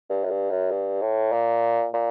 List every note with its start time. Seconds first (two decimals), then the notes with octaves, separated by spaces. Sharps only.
0.10 G2
0.24 F#2
0.30 G2
0.51 F#2
0.71 G2
1.02 A2
1.32 A#2
1.94 A#2